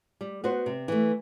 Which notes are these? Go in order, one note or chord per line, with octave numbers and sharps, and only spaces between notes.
G3
B3 F#4 C5
C3
E3 A3